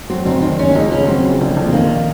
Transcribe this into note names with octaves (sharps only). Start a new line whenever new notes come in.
F#3 C4
F1 C4
D#3 C4
D#2 C#4
C#2 D#4
C#2 C#4
F#3 C4
C#3
A#1
A#1
C4
D#3 A#3